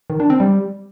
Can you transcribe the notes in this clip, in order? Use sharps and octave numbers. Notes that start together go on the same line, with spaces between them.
D#3
D4
C4
G3